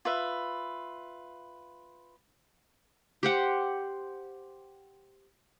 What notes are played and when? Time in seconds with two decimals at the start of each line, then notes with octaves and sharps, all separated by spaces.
0.05 F4 B4 E5
3.23 G4 C5 F#5